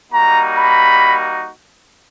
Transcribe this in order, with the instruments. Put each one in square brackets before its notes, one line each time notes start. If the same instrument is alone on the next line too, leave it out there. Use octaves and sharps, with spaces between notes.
[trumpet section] G3 A#3 D#4 F#4 A#5
B5